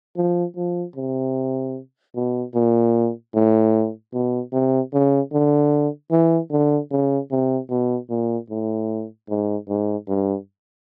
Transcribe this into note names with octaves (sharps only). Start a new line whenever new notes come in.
F3
F3
C3
B2
A#2
A2
B2
C3
C#3
D3
E3
D3
C#3
C3
B2
A#2
A2
G#2
G#2
G2